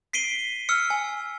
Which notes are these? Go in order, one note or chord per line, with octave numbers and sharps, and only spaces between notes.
B6 C7 D7 D#7 G7
E6 F6 C#7
G#5